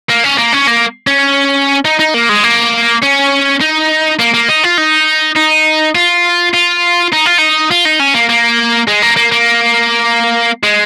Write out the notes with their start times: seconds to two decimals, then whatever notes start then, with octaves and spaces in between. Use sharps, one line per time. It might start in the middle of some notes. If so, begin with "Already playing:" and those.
0.09 A#3
0.24 C#4
0.38 A#3
0.53 C#4
0.68 A#3
1.07 C#4
1.85 D#4
1.99 D#4
2.14 A#3
2.29 G#3
2.44 A#3
3.02 C#4
3.61 D#4
4.19 A#3
4.34 A#3
4.49 D#4
4.63 F4
4.78 D#4
5.36 D#4
5.95 F4
6.54 F4
7.12 D#4
7.25 F4
7.38 D#4
7.71 F4
7.85 D#4
8.00 C#4
8.14 A#3
8.29 A#3
8.88 G#3
9.02 A#3
9.17 A#3
9.32 A#3
10.63 G#3